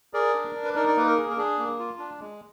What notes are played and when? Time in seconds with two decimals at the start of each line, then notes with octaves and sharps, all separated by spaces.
0.13 G#4 A#4 D5
0.35 D4
0.55 D4
0.64 B4
0.75 D#4 A#4 D5
0.88 D5
0.96 A#3 B4
1.07 A#4
1.17 G#4
1.30 A#4
1.37 D4 G#4
1.59 A#3
1.79 F4
1.99 D4
2.20 G#3